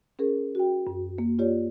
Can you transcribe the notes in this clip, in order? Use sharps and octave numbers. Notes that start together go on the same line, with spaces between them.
C#4 G#4 A#4
F#4 G5
F#2
A#3
F4 G4 C#5 D5